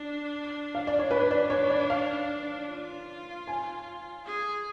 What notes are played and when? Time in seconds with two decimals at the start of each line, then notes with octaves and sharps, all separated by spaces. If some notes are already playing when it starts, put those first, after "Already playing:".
Already playing: D4
0.75 F5
0.87 D5
0.99 C#5
1.11 D4 B4
1.31 D5
1.50 C#5
1.70 D5
1.90 F5
2.68 F4
3.47 G#5
4.26 G#4